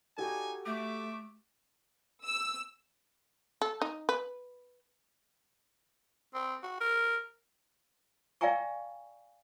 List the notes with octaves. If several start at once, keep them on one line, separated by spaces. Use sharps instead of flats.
D#4 F#4 G4 A4 D5 G#5
A3 E5 D6
E6
A4
D#4
B4
C4
F#4
A#4
D5 F5 G5 G#5 A#5 C#6